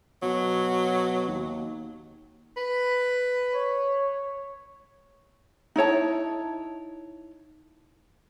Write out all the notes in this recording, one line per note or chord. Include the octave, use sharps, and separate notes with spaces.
B2 F#3
D#2
B4
C#5
D#4 E4 C#5 A5